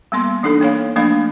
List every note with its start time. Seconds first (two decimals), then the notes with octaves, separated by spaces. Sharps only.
0.12 G3 A#3 B3 C6
0.43 E3 D4 D#4 A4
0.61 A#3 C#5 F5
0.96 F3 A3 A#3 D4 F5 B5